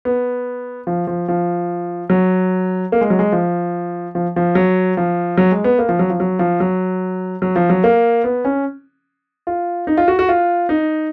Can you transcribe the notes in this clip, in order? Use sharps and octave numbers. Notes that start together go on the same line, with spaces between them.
B3
F3
F3
F3
F#3
A#3
G#3
F#3
G#3
F3
F3
F3
F#3
F3
F#3
G#3
B3
A#3
F3
F#3
F3
F#3
F3
F#3
F#3
F3
F#3
A#3
B3
C#4
F4
D#4
F4
F#4
F#4
F4
D#4